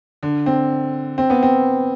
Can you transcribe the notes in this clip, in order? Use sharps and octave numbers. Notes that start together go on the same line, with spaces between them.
D3
C4
C4
B3
C4